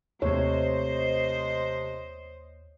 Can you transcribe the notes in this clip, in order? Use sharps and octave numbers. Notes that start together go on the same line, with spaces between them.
D#2 C3 A3 C5 C#5 D#5